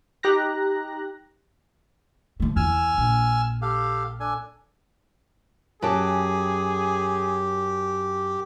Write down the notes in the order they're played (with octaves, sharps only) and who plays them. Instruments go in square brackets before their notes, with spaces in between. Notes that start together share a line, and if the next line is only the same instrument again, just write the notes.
[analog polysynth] D#4 G4 A#5 F#6 A#6
[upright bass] F3 A3
[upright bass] E2 [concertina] G#5 E6 F6
[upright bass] A#1
[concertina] G4 A4 F5
D4 A4 G#5
[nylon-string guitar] F#2 G5 A5 [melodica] G4 [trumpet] G#4